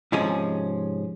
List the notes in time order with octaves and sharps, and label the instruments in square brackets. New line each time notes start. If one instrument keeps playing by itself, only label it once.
[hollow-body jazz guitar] G#2 C3 F3 G#3 C#4 G#4